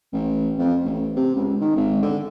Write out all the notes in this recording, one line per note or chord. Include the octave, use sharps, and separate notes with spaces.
A1
F2
A1
C3
C#2
D#3
G#1
D3